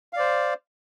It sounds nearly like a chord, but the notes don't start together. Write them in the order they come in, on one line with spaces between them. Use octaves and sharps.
F5 D5 C5